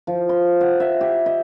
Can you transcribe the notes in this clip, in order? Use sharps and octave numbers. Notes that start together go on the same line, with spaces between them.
F3
C6
F#5
E5
G4
D#5